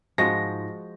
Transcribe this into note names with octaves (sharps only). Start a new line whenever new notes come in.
G#2 F3 G#3 D#4 F4 F#4 A#6